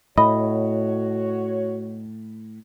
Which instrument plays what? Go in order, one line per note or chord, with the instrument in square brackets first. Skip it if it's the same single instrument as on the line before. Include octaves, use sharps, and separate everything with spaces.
[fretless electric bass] A2 [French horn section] F#4 C#5 [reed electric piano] D#5 [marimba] B5